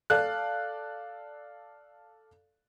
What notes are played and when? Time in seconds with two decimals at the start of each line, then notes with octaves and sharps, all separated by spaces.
0.10 A4 D5 F5 F#6